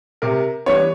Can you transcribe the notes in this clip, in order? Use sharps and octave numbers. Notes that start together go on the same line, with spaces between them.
C3 A#4
E3 G3 B3 D4 C#5